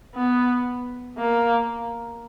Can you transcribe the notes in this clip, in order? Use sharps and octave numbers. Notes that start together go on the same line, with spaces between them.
B3
A#3